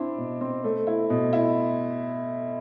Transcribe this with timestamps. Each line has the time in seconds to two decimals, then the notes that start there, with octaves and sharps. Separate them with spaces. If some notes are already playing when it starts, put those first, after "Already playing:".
Already playing: C4 D4 E4
0.18 B2
0.41 C4
0.64 A3
0.87 E4
1.10 B2
1.33 E4